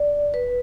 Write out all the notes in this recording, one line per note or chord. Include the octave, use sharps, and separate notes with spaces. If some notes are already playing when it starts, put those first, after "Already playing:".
Already playing: D5
B4